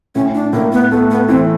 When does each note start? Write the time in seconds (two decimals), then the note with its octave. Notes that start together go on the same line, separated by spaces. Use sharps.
0.15 A2 C#4
0.35 D4
0.53 A2 A#3
0.72 B3
0.91 A3 B3
1.11 B3
1.28 E3 C4